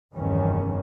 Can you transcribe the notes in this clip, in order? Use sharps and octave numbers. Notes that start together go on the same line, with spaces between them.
F1 E2 G2 D#3 E3 C#4